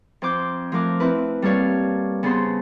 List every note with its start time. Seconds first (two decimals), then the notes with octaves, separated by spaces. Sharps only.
0.22 F2 C5 D6 G6
0.72 F3 A3 A#4 D6 F#6
1.00 C4 E4 B4
1.42 G3 A#3 A4 B4 C#5 F5
2.23 C#3 B3 A4 C5 C6